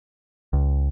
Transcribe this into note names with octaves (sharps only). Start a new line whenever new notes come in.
C#2